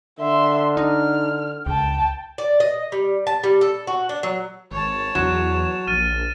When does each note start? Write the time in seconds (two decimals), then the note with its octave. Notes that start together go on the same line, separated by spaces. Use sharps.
0.19 D3 E5 C6
0.77 D#4 F6
1.66 C#2 G5 A5
2.38 D5
2.60 D#5
2.92 G3
3.27 A5
3.43 G3
3.61 A4
3.87 F#4
4.09 D4
4.23 F#3
4.71 G#1 C#5 A5
5.15 E2 F#3 E7
5.87 A#1 F6 A6 D#7